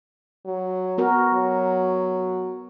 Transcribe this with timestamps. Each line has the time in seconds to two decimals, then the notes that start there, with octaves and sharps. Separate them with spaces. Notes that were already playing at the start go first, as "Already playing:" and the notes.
0.46 F#3
0.98 B3 F#4 A#4
1.33 F#3